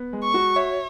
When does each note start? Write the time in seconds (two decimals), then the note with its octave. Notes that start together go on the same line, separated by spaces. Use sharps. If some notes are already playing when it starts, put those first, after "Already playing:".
Already playing: B3
0.13 G#3
0.24 C#6
0.34 F#4
0.55 C#5 E5